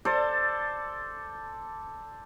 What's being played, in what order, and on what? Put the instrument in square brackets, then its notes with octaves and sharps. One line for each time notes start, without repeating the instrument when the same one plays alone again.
[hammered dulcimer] A4 C5 D5